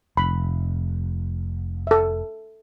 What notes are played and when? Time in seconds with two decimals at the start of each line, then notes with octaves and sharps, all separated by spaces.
0.17 F1 B5
1.87 A4 E5